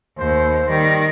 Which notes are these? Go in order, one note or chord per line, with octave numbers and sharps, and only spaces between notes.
D#2 C5
D#3 G3